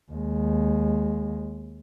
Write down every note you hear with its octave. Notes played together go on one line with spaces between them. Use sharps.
D#2 G#3